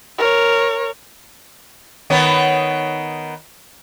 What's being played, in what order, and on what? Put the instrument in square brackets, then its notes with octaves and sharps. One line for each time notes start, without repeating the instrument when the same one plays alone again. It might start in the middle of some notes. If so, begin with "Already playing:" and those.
[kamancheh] A#4 C#5
[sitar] D#3 B3 C#5